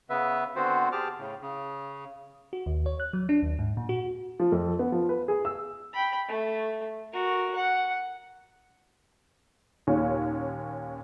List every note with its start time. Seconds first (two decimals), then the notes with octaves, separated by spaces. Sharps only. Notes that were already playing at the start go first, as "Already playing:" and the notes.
0.10 C#3 B3 B4 E5
0.56 D3 B3 C4 F#4 C5
0.92 G4 G#4 A5 D6 F6
1.18 A2 C#3
1.41 C#3
2.53 F#4
2.66 D#2
2.86 C#5
3.00 F#6
3.13 F#3
3.29 D4
3.43 D#2
3.59 G#2
3.77 A#2
3.89 F#4
4.40 F3
4.52 F2
4.79 B3
4.92 F3
5.09 B4
5.28 G#4
5.45 E6
5.93 G5 B5
6.28 A3
7.12 F#4 A#4
7.55 F#5
9.87 D#2 A#2 C#4